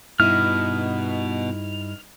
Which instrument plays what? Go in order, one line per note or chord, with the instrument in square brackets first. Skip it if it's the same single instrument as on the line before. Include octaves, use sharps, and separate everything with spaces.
[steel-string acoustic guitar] G2 D#4 E4 [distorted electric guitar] B2 [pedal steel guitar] F6